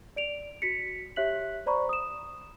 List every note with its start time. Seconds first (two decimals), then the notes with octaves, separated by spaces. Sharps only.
0.16 D5 D7 F7
0.62 F#4 B6 C#7
1.16 G4 C#5 E5 F#6 B6 F#7
1.66 C5 D5 A#5 B5 C#6
1.89 D#6 E7